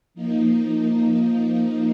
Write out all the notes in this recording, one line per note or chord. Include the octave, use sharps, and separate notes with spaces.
F3 A#3 D#4